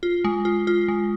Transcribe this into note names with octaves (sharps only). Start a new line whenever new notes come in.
F4
G#3
F4
F4
G#3